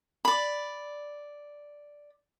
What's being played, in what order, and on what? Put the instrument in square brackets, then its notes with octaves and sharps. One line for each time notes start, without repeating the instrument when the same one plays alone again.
[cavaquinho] D5 B5